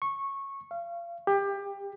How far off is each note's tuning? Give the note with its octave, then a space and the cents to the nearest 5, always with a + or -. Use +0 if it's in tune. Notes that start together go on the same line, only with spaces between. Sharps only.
C#6 -15
F5 -30
G4 +25